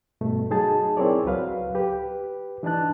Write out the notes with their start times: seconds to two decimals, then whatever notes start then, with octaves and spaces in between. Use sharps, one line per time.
0.21 G2 B2 A3
0.51 F#3 D#4 G#4 A5
0.97 C4 E4 G#4 A#4 C#5 D5
1.25 C#2 F#3 B4 F5
1.75 G4 B4
2.63 E3 D4 D#4 A5 F#6